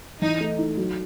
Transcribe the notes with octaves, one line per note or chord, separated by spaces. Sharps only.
E3 D#4
A3
D#4
F#3